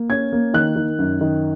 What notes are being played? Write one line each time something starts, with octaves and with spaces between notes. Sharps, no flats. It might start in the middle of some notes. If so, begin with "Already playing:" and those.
Already playing: A#3
C#4 G#6
A#3
D#3 F#6
D#3
F#2
D#3